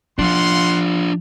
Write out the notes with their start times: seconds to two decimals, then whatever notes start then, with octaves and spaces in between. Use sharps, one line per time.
0.19 F3 D4 F4 F5 F#5 C6